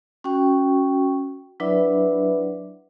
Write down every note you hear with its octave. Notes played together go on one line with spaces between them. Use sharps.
C#4 F#4 G5 C#6
F#3 D4 E4 B4 D5 E5